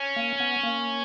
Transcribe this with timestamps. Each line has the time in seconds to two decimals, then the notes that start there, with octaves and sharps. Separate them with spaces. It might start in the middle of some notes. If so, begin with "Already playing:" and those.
Already playing: C#4
0.16 A#3
0.40 B3
0.63 A#3